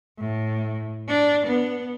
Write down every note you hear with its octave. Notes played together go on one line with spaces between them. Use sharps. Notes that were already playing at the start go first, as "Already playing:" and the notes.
A2
D4
B3